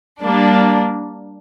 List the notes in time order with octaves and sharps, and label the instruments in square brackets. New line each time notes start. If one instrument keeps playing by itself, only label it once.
[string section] G3 A#3 D4